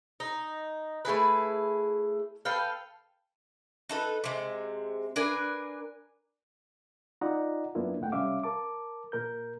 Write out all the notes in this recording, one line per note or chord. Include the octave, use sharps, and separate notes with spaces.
D#4
A3 E4 G#4 B4
A4 B4 F5 G5
D#4 A4 B4
C3 G#3
D4 A#4 B4 G#5
D#4 F4 D5 D#5 F#5 A#5
F#2 A#3 B3 D4 E4 F4
C#2 G#2 A3 F#5 G5
C3 G3 C#4 E5 F5 D6
A#4 A5 D6
A#2 A#4 G6